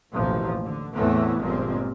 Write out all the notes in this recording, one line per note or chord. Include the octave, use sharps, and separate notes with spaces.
A1 D#2 B2 F3
D3
E2 A2 E3 A3 B3 C4
G1 A#2 F3 G#3 C4